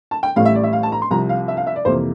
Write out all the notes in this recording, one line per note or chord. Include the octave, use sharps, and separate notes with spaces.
A5
G5
A1 A2 G3 F5
E5
D5
E5
F5
A5
A#5
C6
C2 C3 F3 A#5
F5
E5
F5
E5
D5
F2 C3 E3 A#3 C5